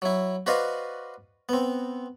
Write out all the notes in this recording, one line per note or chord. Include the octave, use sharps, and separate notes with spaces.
F#3 E4
F#4 B4 C5 D5 D#5 F5
B3 C4